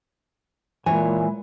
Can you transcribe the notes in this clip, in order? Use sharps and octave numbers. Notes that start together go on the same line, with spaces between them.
A#2 E3 G#3 C#5 G#5 B5